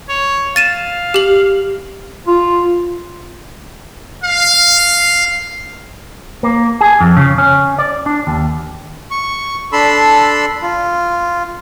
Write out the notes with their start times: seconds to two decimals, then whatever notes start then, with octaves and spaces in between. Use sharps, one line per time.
0.09 C#5
0.56 F5 A6 D#7 E7
1.14 G4 F#7
2.27 F4
4.23 F5
6.43 A#3
6.81 G#4
7.01 F2
7.17 C#3
7.38 C#4
7.79 D5
8.06 D4
8.27 D#2
9.11 C#6
9.73 D4 A4 B5 C6 E6
10.62 F4